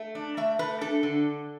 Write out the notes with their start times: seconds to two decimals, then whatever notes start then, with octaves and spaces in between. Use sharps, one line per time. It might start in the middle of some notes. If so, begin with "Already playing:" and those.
Already playing: A3
0.15 D4
0.37 A3 E5
0.59 A3 B4
0.81 D4 A4
1.03 D3